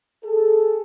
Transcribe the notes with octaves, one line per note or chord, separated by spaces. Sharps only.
G#4 A4